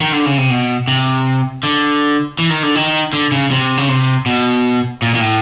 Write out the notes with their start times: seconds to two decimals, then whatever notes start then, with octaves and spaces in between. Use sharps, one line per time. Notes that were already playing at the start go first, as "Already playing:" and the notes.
0.01 D#3
0.12 D3
0.26 C#3
0.38 C3
0.50 B2
0.88 C3
1.63 D3
2.39 E3
2.50 D#3
2.63 D3
2.75 D#3
3.13 D3
3.32 C#3
3.51 C3
3.77 C#3
3.89 C3
4.26 B2
5.02 A#2
5.15 A#2
5.20 A2